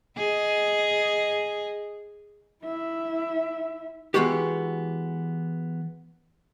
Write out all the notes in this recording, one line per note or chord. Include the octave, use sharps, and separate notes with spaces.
G#4 D#5
E4 E5
E3 F#3 G#3 B3 F#4 G4